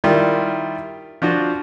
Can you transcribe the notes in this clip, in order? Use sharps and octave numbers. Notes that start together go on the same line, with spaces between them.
D#3 G3 E4 F4
F3 D4 F4 F#4